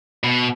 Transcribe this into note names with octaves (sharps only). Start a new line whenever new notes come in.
B2